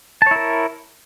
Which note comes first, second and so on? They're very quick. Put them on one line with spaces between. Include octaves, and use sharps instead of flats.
A5 C#5 E4 A#4